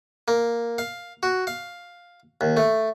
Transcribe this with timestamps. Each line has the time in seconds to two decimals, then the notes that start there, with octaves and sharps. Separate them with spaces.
0.28 A#3
0.78 F5
1.23 F#4
1.47 F5
2.41 D#2
2.57 A3